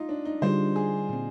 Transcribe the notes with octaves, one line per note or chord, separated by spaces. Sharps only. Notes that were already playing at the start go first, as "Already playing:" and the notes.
Already playing: D#4 F4
D4
D#4
D3 G3 D4 F4 G#4 C5
G#4
A#2 G3 C4